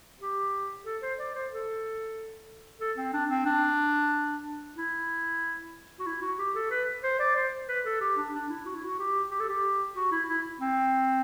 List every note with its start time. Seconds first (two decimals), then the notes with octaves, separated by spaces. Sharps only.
0.21 G4
0.85 A4
1.02 C5
1.19 D5
1.35 C5
1.51 A4
2.80 A4
2.97 C4
3.13 D4
3.30 C4
3.46 D4
4.76 E4
6.00 F#4
6.06 E4
6.22 F#4
6.39 G4
6.55 A4
6.71 B4
7.04 C5
7.19 D5
7.35 C5
7.68 B4
7.85 A4
8.01 G4
8.17 D4
8.34 D4
8.49 E4
8.66 F#4
8.75 E4
8.84 F#4
8.99 G4
9.31 G4
9.40 A4
9.49 G4
9.96 F#4
10.12 E4
10.29 E4
10.61 C4